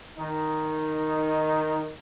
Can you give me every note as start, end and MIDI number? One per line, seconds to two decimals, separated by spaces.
0.18 1.90 51
0.18 1.90 63